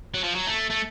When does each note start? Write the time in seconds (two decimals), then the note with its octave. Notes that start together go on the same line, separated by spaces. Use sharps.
0.14 F#3
0.24 F3
0.35 F#3
0.47 A3
0.70 A3